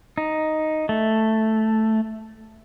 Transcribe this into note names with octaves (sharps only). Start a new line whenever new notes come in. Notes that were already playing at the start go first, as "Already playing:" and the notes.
D#4
A3